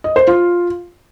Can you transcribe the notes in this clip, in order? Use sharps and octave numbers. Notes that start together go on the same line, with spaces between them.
D#5
C5
F4